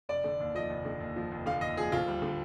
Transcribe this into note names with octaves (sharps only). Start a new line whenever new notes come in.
F1 D5
D3
D#2
F3 D#5
F1
D3
D#2
F3
F1
D3 F5
D#2 D#5
F3 G#4
D2 F4
G3
D3